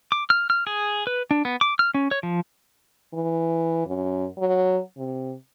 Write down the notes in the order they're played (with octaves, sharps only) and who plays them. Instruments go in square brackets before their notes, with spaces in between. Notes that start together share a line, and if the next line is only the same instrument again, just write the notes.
[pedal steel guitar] D6
F6
F6
G#4
B4
D4
B3
D6
F6
C#4
C#5
F3
[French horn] E3
F#2
F#3
C3